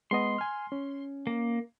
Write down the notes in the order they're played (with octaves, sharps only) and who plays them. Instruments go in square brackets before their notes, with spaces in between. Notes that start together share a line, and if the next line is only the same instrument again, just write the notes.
[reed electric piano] G#3 B3 D#5 [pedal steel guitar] C6
[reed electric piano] G#5 F6
C#4
[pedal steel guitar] A#3